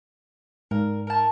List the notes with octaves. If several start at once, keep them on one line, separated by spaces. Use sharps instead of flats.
G#2 A#4
A#4 A5